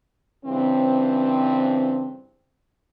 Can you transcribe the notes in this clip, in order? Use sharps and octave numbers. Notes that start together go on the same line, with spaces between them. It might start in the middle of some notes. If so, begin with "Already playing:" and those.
G2 C#3 E3 C4